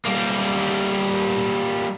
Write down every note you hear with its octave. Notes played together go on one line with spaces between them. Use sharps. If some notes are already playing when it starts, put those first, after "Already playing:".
G3 A#3